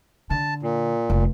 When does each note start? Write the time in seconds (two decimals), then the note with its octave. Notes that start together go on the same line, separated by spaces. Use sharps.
0.30 D3 A5
0.63 A#2
1.10 F1